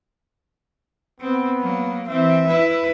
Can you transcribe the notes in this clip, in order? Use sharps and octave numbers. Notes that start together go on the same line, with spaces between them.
B3 C4
F#3 A#3
E3 C4 E5
E4 B4